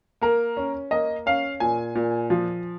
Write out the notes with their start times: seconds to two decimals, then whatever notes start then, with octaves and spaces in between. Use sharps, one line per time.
0.21 A#3 A#4
0.57 C#4
0.91 A#3 D#5
1.26 C#4 F5
1.60 A#2 G#5
1.95 A#2
2.30 F3